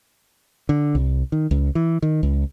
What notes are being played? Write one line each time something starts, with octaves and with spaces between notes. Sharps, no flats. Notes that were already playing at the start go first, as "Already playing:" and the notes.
D3
C2
D#3
C#2
E3
D#3
C#2